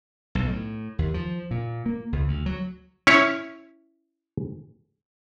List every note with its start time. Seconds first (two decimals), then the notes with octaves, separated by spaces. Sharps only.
0.35 B1
0.48 A2
0.99 D#2
1.14 F3
1.51 A#2
1.86 A#3
2.12 C#2
2.28 D2
2.46 F#3
3.07 C#4 E4 C#5